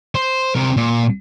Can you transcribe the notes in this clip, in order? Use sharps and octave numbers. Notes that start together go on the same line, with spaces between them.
C5
C3 A#4
A#2